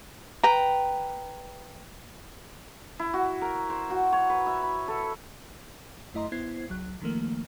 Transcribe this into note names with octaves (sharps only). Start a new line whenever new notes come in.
B4 G5 A#5
E4
F#4
A#4
C5
F#4
C#5
B4
E5
B5
A4
F#2 A3 E4 D#5 A#5 C6
G#1 B3 E4 C5 G#6 C7
G#1 C#2 F#3 F#6
D#3 F3 A3 A#3